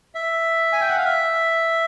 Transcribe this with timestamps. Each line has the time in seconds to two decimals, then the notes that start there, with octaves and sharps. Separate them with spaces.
0.15 E5
0.73 G#5
0.81 G5
0.89 F#5
0.97 F5
1.05 E5